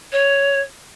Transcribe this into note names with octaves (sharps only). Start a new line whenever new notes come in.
C#5